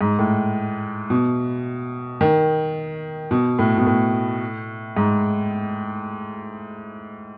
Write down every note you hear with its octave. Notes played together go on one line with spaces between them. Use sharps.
G#2
A2
B2
D#3
B2
A2
B2
A2
G#2